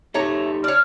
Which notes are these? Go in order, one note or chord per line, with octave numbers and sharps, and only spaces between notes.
A3 D#4 G4 A4 C#5 A#5
D4 C#5 F6